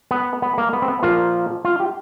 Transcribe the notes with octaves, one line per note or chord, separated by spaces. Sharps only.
B3
B3
A#3
B3
C4
B3
A#2 F3 A#3 F4
F4
G4